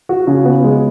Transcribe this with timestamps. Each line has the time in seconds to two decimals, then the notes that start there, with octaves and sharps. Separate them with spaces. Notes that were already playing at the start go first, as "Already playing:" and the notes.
0.09 F#4
0.27 C#3
0.45 B3
0.64 G#3